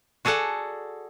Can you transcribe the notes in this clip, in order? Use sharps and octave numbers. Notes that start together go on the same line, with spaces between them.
F#4 G#4 A4 D5 F#5